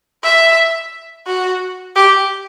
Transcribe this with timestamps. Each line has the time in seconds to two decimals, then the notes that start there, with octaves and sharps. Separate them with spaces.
0.23 E5
1.27 F#4
1.95 G4